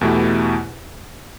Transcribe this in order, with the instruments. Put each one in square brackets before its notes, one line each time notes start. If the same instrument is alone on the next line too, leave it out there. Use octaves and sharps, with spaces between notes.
[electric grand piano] E2 B2 A3 E4 G4